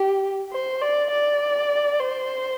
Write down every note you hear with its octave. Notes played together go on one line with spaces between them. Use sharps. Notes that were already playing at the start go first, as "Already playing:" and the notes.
Already playing: G4
C5
D5
D5
C5